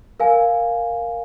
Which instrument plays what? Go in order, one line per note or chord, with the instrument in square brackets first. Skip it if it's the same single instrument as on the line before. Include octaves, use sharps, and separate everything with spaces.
[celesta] A#4 F5 G#5